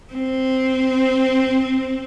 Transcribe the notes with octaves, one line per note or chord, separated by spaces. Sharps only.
C4